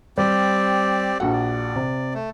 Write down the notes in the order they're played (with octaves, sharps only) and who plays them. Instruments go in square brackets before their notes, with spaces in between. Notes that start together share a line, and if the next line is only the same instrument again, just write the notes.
[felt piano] G3 [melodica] C4 G4 D5
[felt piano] A#1 F#4 F#5 [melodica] A4
[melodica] D5
[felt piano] C3
[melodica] A3